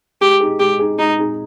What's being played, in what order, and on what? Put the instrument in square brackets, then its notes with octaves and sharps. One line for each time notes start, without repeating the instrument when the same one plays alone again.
[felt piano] G#3 [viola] G4
[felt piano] D#4 G#4
[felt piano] G#3 [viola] G4
[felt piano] D#4 G#4
[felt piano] G#3 [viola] D#4
[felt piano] D#4 G#4